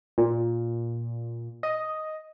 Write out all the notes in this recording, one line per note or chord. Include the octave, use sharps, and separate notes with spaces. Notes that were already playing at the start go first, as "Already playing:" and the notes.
A#2
D#5